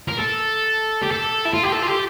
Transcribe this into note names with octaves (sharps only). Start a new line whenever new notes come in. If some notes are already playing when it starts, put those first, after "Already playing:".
A#4
A4
G4
A4
E4
F4
G4
A4
F4
G4